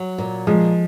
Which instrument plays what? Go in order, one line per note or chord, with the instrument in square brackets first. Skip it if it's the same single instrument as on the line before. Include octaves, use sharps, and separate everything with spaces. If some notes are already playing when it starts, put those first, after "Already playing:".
Already playing: [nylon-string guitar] F#3
A#2
[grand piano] F3 [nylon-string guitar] G#3